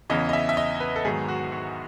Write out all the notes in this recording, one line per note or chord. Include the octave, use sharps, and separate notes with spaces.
E2 C#3 E3 D#5
D#5
E5
E5
D#5
B4
A4
G#2 D#3 F#3 B3 G#4
F#4
F#4